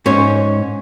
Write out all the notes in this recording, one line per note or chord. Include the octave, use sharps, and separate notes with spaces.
G#2 C#4 C#5